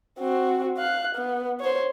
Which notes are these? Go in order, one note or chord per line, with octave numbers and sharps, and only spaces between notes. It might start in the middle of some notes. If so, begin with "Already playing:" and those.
C4 F#4
F5 F#6
B3
C5 C#5